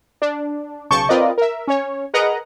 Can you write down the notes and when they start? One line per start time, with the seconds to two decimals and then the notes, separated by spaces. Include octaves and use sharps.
0.22 D4
0.90 B1 C#3 A5 C#6 D6 G6
1.09 C4 F4 A#4 B4 D5 D#5
1.38 A#4 E5
1.67 C#4 C#5
2.14 G#4 A#4 B4 D#5 F#5 A#5